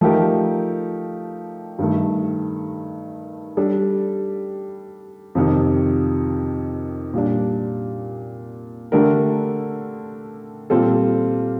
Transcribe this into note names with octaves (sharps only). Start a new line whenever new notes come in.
F3 A3 D#4 G4 A#4
G2 D#3 A3
G3 D4 A4
F2 C3 D#3
A#2 G3 D4
D3 A3 D4 G4 A#4
A#2 G3 C4 F4 A4